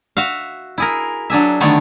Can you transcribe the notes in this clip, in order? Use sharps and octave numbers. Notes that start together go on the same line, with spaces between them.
F#4 E5 F5
E4 G#4 A#4
F#3 D4 G#4 E5
D3 D#3 A3 B3 C#5